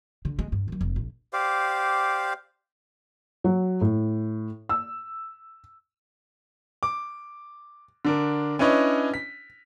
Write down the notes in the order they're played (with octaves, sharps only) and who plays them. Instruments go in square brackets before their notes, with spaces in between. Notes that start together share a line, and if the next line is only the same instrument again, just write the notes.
[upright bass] D3
G#3
G2
D#3 F#3
F1
A#1
[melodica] G4 C5 D5 F5
[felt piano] F#3
A2
E6
[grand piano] D6
D3 D4 A#4
C#4 D4 E4 B4 C#5 D#5
B6